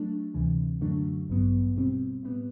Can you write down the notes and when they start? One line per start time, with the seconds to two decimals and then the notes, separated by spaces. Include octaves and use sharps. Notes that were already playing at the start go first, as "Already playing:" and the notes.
Already playing: F#3 A3 D4
0.34 D2 C3 E3
0.81 F#2 D3 F#3 A3 D4
1.29 A1 G2 F#3 B3
1.75 B2 G3 C4
2.23 A2 G3 B3